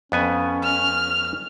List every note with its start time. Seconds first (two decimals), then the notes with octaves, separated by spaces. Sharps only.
0.12 F2 B3 C#4 G#5
0.64 F6